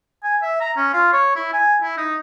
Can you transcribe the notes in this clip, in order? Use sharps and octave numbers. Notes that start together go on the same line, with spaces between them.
G#5
E5
A#5
C#4
F4
C#5
E4
G#5
E4
D#4